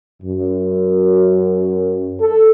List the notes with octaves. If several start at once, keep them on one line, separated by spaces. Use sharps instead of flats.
F#2
A4